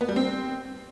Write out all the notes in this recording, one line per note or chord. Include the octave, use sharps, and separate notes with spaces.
B3
G3
C4